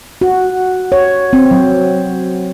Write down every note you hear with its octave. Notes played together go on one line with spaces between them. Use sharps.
F#4
C#5
C4
F#3